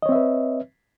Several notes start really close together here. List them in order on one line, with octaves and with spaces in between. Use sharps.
D#5 C#5 C4 E5 B4